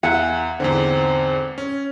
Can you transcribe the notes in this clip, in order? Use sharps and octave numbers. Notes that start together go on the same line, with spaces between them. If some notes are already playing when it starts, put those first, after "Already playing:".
E2 E5 F#5 G#5
E2 G#2 D3 C4
C#4